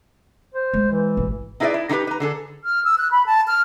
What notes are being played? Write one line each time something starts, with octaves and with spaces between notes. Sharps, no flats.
C5
G#3
E3
G#1
D#4 E4 G#4 B4 D5 E5
E4
D3 D#4 F4 G4 B4
B4 A#5
D3 G#4 A4
F6
E6
F#6
B5
A5
F6